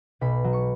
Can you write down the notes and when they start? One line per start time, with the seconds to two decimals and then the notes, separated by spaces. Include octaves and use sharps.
0.21 B1 B5
0.44 F#3
0.53 C#6